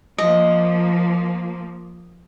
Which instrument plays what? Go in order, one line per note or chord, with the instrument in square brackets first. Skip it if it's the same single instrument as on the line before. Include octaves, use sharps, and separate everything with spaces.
[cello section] F3 A#3 [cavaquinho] D#5